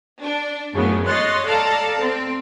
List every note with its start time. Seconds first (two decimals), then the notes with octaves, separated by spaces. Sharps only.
0.22 D4
0.73 F#2 A2 C#3 F#3 B3
1.07 C#5 D#5 C6 F#6 A6
1.45 A4 D5 F5 A5 A#5
1.98 C4